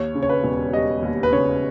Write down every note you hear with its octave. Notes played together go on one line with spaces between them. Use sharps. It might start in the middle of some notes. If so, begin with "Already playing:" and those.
Already playing: D#2 C#5
C#3
C#5
B4
E1
G3 D#5
D#2
B4
C#3 C#5